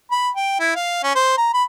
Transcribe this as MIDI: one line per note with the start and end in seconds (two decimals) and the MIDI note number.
0.11 0.28 83
0.36 0.56 79
0.59 0.72 64
0.75 1.01 77
1.03 1.13 61
1.16 1.34 72
1.38 1.50 82
1.54 1.63 83